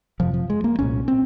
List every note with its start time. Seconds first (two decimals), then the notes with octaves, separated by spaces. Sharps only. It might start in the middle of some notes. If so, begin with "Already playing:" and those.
0.20 F2 C3 F3
0.34 F3
0.50 G#3
0.64 A#3
0.79 C2 A#2 C#4
1.08 C4